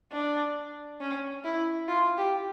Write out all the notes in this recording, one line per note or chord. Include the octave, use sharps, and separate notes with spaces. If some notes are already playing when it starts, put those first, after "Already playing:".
D4
C#4
E4
F4
G4